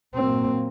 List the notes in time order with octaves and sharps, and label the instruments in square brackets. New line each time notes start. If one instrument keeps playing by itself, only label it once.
[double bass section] A#2 F#3 A#3 [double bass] C4